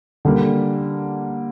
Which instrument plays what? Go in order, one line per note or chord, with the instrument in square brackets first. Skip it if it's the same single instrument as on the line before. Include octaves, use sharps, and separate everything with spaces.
[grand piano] D3 G3 A#3